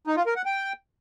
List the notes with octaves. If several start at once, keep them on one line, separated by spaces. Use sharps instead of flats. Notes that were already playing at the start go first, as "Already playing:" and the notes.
D#4
F4
A#4
F#5
G5